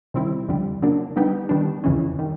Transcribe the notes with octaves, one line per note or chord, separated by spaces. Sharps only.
C3 D#3 G3 C4 E4
F2 D3 G3
C#3 F#3 A#3 D4
D3 G3 B3 D#4 G4
D#3 G3 B3 D4
F2 C#3 E3 G#3 C#4
D#3 G3